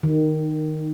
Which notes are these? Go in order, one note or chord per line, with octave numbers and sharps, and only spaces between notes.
D#3